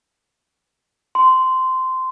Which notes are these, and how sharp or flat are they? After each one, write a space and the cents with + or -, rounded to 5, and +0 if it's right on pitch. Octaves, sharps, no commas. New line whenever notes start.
C6 -15